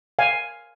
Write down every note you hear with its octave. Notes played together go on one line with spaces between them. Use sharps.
F5 G#5